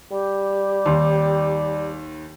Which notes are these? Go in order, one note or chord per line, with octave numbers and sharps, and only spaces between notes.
G3 G4
D#2 C6